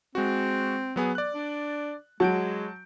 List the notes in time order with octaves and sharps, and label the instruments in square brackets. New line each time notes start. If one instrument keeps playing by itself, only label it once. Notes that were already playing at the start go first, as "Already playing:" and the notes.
[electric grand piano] G#3 F#4 [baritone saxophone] C4
[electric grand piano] F#3 B3 G#4
D5 F#6
[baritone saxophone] D4
[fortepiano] F#3 F#4 [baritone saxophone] G#3 [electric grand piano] A5 G6 D7